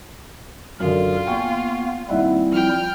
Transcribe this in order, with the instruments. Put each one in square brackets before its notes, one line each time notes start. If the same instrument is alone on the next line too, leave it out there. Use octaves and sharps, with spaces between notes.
[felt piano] F#2 D3 [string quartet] F4 [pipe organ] A#4
[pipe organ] A#3 B3 [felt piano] G5 G#5 C#6
[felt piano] D#2 E5 F#5 [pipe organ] G3 C4 E4
[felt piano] F3 [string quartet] G5 F6